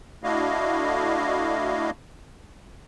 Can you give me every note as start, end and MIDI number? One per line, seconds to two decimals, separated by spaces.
0.24 1.90 57
0.24 1.90 62
0.24 1.90 64
0.24 1.90 66
0.24 1.90 75
0.24 1.90 77